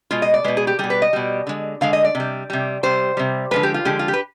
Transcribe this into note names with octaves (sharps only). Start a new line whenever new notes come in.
B2 G#3 F4
D#5
D5
B2 G#3 B4
G#4
G4
B2 G3 G#4
B4
D#5
B2 G3
D3 G#3
D3 G#3 F5
D#5
D5
C3
G3
C3 G3
C3 G3 C5
C3 G3
D3 F3 G#3 B4
G4
F4
D3 F3 G#3 G4
F4
G4
B4